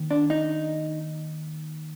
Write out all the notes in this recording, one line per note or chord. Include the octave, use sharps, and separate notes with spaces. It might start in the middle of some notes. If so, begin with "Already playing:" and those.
Already playing: D#2 D#3
D4
D#4